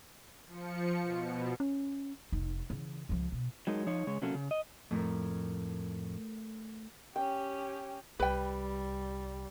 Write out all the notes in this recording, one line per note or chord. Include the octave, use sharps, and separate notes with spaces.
F3 C#7
B2
C#4
F1 D#4
C#3 E3
C#2 F3
B2
F#3 G#3 D#4 A#4
F3 D#4 C#5
C#3 G#3 C#5
C3 F#3 A#3 C#4 A4
C#3
D#5
F2 A2 A3 A#4
C#4 G4 G5
C2 G3 B4 G5